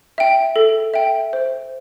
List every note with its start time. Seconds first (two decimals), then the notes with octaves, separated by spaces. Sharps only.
0.18 E5 G5
0.56 A4
0.94 E5 G5
1.33 C5